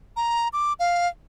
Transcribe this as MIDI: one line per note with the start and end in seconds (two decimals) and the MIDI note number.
0.16 0.48 82
0.53 0.73 86
0.80 1.08 77